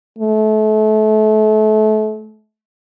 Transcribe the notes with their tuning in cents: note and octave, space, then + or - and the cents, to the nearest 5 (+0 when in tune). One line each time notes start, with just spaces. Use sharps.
A3 -30